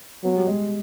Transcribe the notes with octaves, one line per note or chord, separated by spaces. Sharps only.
F#3 B3
G3
G#3